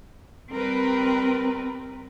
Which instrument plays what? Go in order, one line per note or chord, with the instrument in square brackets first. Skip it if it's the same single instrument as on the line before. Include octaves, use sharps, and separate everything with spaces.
[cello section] G3 A#4 B4 [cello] C4